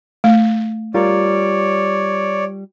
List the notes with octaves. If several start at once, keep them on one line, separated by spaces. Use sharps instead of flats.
A3
G3 F4 A#4 C#5 D5